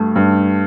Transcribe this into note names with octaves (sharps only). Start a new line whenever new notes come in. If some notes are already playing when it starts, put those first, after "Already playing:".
Already playing: G2 A3
G2